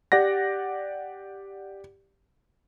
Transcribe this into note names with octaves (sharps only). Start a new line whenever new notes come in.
G4 D5 F#5 A#6